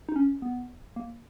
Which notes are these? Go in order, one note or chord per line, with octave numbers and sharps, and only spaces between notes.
D#4
C#4
B3
A#3